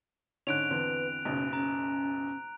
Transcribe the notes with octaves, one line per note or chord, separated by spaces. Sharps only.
G#2 D3 C#4 F#6 D7 F7
E2 D3 C4 B4
F#1 B1 C#3 C#4
C#4 A#5